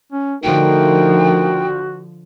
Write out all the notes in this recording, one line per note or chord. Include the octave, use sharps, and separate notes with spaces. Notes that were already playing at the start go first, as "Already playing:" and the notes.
C#4
D3 F3 A3 D#4 F#4 A#4 G5